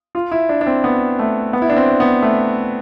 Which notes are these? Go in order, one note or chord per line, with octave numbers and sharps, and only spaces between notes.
F4
E4
D4
D4
C4
B3
A3
B3
E4
D4
C4
B3
A3